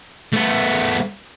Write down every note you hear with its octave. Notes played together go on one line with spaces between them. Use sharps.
A3 B3